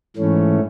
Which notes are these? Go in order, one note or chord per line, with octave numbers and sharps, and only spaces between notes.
G#2 E3 A3 C#4